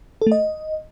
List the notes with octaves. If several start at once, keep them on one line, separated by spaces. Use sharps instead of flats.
A4
A3
D#5